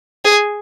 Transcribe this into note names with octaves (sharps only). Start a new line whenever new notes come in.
G#4